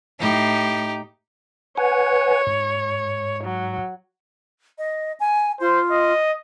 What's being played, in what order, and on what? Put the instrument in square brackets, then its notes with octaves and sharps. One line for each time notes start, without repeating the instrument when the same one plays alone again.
[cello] A2 [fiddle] D#4 G4
[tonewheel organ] B4 F#5 G#5 [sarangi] C#5
[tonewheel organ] G#2
[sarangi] F#3
[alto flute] D#5
G#5
[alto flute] F4 [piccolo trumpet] C5
[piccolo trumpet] D#5